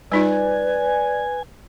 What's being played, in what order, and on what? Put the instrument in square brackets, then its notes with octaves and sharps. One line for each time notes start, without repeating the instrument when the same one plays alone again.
[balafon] G3 D#4 F4 [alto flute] B4 [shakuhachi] D5 [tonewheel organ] G#5